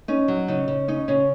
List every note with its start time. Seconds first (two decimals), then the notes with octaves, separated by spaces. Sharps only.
0.08 C#4 D#4
0.28 F#3
0.48 C#3 D#4
0.68 C#3
0.88 C#4 D#4
1.08 C#3 C#4